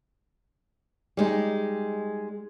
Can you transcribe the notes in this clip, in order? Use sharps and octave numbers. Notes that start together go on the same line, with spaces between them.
G3 G#3 D#4